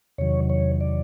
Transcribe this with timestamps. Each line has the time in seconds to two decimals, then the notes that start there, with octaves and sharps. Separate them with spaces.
0.18 E2 C3 D#3 F#3 C#5
0.50 C#5
0.81 D5